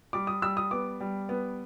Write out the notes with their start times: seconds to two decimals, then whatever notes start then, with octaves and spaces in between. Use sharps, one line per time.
0.13 G3 D6
0.27 D#6
0.42 G3 E6
0.57 D#6
0.71 B3 D6
1.00 G3
1.29 B3